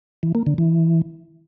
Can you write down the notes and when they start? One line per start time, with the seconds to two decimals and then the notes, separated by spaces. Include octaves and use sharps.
0.23 E3
0.35 A#3
0.46 D3
0.58 E3